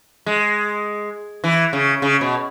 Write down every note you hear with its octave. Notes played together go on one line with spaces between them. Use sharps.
G#3
E3
C#3
C#3
B2